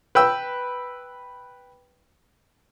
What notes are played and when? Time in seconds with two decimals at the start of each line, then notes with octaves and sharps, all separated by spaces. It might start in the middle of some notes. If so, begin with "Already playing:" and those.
0.15 B4 G5 E6